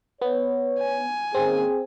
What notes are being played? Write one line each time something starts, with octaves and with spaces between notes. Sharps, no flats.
B3 C#5
G#5
D#3 A#3 C4 C#4 G#4